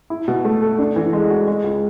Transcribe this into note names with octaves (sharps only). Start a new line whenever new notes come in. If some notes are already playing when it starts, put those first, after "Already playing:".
E4
B2
A3
A4
D4
E3
G#3
F#4
G#3
C#2